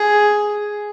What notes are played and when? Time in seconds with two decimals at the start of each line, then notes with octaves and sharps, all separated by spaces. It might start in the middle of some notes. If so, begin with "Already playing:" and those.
Already playing: G#4